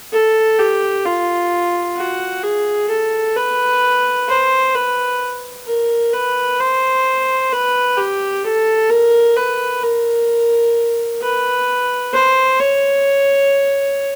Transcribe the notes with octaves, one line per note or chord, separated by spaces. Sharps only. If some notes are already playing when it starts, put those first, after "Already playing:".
A4
G4
F4
F#4
G#4
A4
B4
C5
B4
A#4
B4
C5
B4
G4
A4
A#4
B4
A#4
B4
C5
C#5